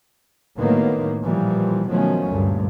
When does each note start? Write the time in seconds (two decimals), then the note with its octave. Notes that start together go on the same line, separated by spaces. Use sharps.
0.57 A2 D#3 F#3 A#3 B3
1.23 A#2 E3 F3 G3
1.88 B2 D#3 F3 F#3 A3 C#4
2.29 D2 G2 A#2